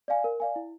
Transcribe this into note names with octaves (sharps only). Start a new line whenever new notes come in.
D5 F5 G#5
A#4
D5 F5 G#5
E4